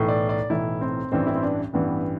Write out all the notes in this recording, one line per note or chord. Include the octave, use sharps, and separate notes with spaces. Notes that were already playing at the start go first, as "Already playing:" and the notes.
Already playing: B1 A2 E3
D5
D5
B1 A2 E3 E4
C4
A1 G2 E3 C4
E4
C4
D4
A1 G2 E3 B3